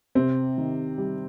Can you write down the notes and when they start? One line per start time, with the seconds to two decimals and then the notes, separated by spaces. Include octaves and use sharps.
0.15 C3 C4
0.58 D#3
0.98 G3